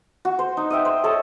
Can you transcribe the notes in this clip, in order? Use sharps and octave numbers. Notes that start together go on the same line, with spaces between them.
F#4
C5
D#4
D#5 E5 G5
C5
A4 C#5 D#5 A5